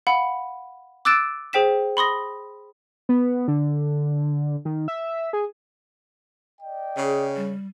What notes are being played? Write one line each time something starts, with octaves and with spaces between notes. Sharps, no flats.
F5 F#5 B5
D6 E6 F#6 A6 D7 E7
G#4 C5 G5 B6 E7
B5 C6 D#6 A#6
B3
D3
D#3
E5
G#4
D5 D#5 G5
C#3 G#4
G3